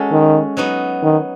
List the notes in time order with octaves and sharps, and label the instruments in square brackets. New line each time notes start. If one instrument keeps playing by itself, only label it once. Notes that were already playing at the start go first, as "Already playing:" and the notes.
Already playing: [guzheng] G#3 C#4 F#4 A4
[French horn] D#3
[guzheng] F#3 B3 D#4 F#4
[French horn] D#3